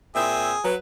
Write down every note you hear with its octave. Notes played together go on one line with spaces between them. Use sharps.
A#2 C4 G#4 E5
F#3 B4